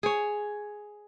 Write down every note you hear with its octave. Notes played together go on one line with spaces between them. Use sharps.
G#4 C#5